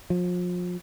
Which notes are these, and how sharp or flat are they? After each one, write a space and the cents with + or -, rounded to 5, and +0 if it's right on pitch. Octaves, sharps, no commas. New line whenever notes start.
F3 +35